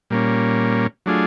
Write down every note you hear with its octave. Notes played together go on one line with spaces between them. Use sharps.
A#2 G3 A#3 C#4
F#3 A3 D4 F4 G#4